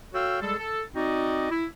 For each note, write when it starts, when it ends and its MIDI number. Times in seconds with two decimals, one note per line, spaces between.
0.13 0.40 66
0.13 0.40 69
0.13 0.40 73
0.13 0.40 77
0.13 0.40 79
0.13 0.40 88
0.41 0.54 55
0.41 0.54 56
0.41 0.54 68
0.41 0.54 69
0.58 0.82 69
0.95 1.48 60
0.95 1.48 63
0.95 1.48 66
0.95 1.48 74
0.95 1.48 75
1.51 1.65 64